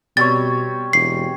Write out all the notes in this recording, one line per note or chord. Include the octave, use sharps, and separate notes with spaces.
B2 G3 C4 C#5 A6
E1 C7